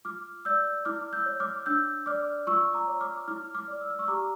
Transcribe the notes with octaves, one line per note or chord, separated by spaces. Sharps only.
F4 D6 F6
D5 E6 G6
E4 D6 F6
E6 G6
C#5
D6 F6
D4 E6 G6
D5 D6 F6
F4 C#6 E6
A#5 D6
C#5
D6 F6
E4 D6 F6
D6 F6
D5
E6
F6
C#6 E6
G4 A#5 D6